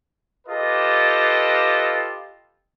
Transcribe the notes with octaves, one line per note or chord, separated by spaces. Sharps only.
F4 G4 A4 B4 D#5